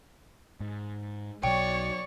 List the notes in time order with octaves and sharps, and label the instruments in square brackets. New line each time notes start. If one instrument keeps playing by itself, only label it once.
[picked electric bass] G#2
[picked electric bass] B1 B2 F#3 [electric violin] C#5 D5 [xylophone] G5 [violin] C#6